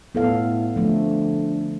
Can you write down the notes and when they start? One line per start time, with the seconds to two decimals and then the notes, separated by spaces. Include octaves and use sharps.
0.15 A2 B3 A4 F5
0.76 D3 F3 A3